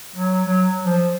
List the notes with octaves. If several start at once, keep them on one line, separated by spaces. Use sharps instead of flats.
F#3
F#3
F3